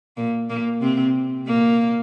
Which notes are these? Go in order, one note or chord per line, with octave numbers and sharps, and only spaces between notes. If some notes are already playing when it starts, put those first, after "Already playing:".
A#2 A#3
A#2 A#3
C3 C4
A#2 A#3